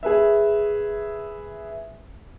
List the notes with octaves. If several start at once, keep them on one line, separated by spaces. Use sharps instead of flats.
G#4 B4 E5